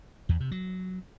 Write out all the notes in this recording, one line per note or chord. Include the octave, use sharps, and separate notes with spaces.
E2
C3
F#3